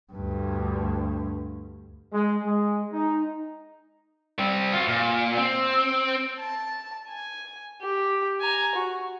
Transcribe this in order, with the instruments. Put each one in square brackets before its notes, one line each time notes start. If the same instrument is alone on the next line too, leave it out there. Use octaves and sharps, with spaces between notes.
[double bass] D2 G2
[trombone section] G#3
G#3
D#4
[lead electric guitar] G3 C4
F4 F#4
A#2
C4
[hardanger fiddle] A5
G#5
G4
G#5 A#5
F#4